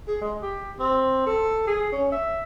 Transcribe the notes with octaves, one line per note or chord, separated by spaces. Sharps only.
G#4
G#3
G4
C4
A4
G#4
C#4
E5